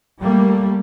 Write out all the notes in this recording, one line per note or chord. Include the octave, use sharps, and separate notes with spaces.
G3 A3 A#3